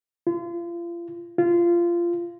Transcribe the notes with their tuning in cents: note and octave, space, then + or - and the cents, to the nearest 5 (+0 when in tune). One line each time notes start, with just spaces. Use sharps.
F4 -35
F4 -20